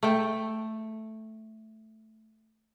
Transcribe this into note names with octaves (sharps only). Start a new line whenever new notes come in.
A3 G5